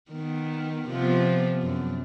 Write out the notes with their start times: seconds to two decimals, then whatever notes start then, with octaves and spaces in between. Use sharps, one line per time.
0.12 D#3 B3
0.88 C3 F3 B3
1.62 F#2